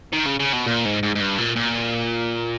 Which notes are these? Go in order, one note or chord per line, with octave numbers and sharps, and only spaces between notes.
D#3
C#3
C#3
B2
A#2
G#2
G#2
G#2
G2
A#2
A#2